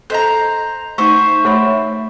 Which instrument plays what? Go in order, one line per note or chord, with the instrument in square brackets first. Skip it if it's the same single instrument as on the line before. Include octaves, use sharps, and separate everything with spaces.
[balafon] A4 D#5 [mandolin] C5 A#5
[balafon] A3 D#4 [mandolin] C5 E5 [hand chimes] C#6
[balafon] A3 C#5 B5